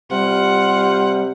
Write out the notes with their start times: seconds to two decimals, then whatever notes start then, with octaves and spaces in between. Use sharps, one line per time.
0.11 C3 G3 F4 F#5